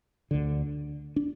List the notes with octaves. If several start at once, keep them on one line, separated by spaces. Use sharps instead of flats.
D2 D3
D4